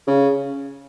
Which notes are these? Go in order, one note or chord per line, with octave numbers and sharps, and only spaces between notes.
C#3